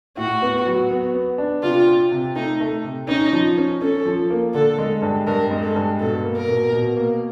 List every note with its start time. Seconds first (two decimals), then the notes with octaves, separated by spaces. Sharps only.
0.17 A2 F#4
0.42 B3
0.66 F#3
0.91 B3
1.15 B3
1.38 D4
1.63 C3 F4
1.87 C4
2.12 C3
2.36 A3 D#4
2.60 A3
2.84 C3
3.08 C#4 D#4
3.33 F3
3.57 C#4
3.81 C#4 A4
4.06 F3
4.30 A#3
4.54 D3 A4
4.79 G#3
5.02 G2
5.27 G2 A#4
5.51 G#3
5.63 A4
5.76 G2
5.99 B2 A4
6.23 A#3
6.36 A#4
6.48 B2
6.72 B2
6.97 A#3